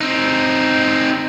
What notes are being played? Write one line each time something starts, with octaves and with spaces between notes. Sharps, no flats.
C4 D#4